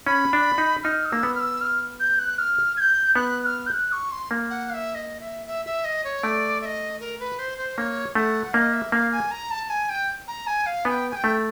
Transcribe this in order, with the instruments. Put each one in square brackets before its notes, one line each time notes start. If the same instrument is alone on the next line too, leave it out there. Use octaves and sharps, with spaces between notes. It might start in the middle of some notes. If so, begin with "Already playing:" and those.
[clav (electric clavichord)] C#4 [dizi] B5
[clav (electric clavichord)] D4
D#4
[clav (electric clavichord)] D#4 [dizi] F6
[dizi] D#6
[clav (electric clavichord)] A#3 [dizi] E6
[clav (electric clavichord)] B3
[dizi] F6
E6
F6
G6
F#6
F6
G#6
G6
[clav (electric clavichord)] B3 [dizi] F#6
[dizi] F#6
F6
G6
F#6
C#6
C6
[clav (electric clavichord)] A#3
[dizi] F#5
F5
E5
D#5
E5
E5
E5
D#5
C#5
[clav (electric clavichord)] A3 [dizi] D5
[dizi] E5
D#5
A#4
B4
C5
C5
[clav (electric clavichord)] A#3 [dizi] C#5
[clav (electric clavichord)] A3 [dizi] F#5
[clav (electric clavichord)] A#3 [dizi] D#5
[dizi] E5
[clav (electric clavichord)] A#3 [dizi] F5
[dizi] G#5
A#5
A5
G#5
G5
A#5
G#5
F5
[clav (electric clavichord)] B3 [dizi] G#5
[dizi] G5
G#5
G5
[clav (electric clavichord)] A3